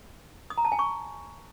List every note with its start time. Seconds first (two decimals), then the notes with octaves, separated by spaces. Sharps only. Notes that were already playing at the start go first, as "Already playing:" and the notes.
0.50 D#6
0.58 A#5
0.65 A5
0.72 G#5
0.79 C#6